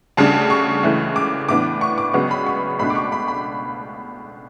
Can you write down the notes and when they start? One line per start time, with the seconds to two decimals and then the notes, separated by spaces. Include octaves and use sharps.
0.17 D2 C#3 G3 D4 A5
0.50 C#6
0.83 C#2 C#3 E3 A3
1.16 D6
1.49 A2 E3 B3 D4 D6
1.81 C#6
1.98 D6
2.13 C#2 C#3 F#3 B3 C#6
2.31 B5
2.46 C#6
2.79 C#2 B2 A3 D4 B5
2.90 D6
2.96 C#6
3.12 B5
3.28 B5